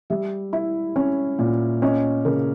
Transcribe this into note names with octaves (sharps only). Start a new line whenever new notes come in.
G3 E5
E4
C#4
A#2
C#4 D#5
C#3 A#4